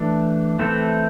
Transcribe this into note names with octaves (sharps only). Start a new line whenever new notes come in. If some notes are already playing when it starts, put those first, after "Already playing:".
Already playing: E3 A3 D4 A4
E3 A3 C4 E4 A4